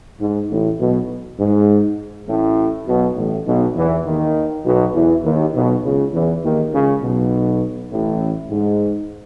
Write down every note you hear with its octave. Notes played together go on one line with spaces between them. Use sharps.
G#2
A1 A2
B1 B2
G#2
A1 A2
B1 B2
A1 A2
B1 B2
E2 E3
D#2 D#3
B1 B2
E2 E3
D#2 D#3
B1 B2
C#2 C#3
E2 E3
D#2 D#3
C#2 C#3
B1 B2
A1 A2
G#2